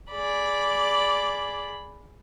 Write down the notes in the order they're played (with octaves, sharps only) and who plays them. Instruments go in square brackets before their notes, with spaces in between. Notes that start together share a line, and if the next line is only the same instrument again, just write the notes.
[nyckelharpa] G#4 B5 [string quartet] D5